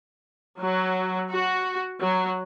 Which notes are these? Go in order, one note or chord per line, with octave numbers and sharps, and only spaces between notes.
F#3
F#4
F#3